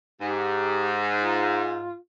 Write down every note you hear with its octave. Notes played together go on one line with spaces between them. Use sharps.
G#2 G4
F4